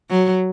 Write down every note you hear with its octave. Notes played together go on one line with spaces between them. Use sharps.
F#3